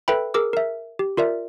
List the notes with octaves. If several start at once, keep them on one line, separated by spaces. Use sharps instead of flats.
A4 B4 E5 G5 B5
G#4 A#4 D6 E6
A#4 E5
G4
F4 A#4 D5 E5